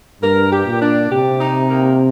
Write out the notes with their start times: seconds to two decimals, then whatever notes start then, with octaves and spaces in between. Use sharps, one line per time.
0.22 G2 A#4
0.52 G4
0.66 A#2
0.82 D4
1.10 C3 G4
1.40 D#4
1.70 A#3